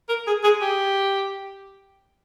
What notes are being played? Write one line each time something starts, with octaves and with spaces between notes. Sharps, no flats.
A#4
G#4
G#4
G4